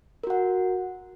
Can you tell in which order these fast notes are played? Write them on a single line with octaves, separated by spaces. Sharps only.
A#4 F#4 F#5